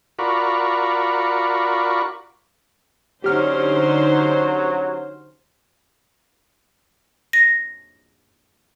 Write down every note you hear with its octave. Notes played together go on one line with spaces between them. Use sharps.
F4 F#4 A#4 D5 B5 C#6
D3 F#3 C#4 D#4 G4 C5 F6
A#6